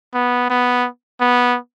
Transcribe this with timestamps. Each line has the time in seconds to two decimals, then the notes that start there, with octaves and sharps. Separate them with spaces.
0.14 B3
0.50 B3
1.20 B3